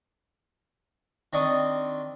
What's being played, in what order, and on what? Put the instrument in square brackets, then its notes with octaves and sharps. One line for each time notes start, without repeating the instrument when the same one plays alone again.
[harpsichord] D#3 C4 D4 D5 C#6 D#6